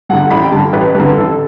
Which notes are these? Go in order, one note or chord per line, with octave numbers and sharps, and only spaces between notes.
G2 D3 F#5
A1 B5
G5
G2 D3 A5
A1 B4
G2 D3 B4
A1 A4